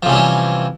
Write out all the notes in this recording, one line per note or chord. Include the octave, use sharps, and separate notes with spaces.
C3 E3 F3 G3 C#4